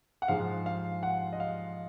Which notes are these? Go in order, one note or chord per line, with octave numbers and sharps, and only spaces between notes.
F#5
G#2 F3 G#3 F5
F5
F#5
D#5
F5